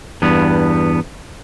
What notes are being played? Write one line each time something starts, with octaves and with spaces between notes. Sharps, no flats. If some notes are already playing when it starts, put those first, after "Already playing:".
E2 G2 B3